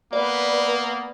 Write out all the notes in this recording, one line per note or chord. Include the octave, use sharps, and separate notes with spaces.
A#3 B3 B4 D5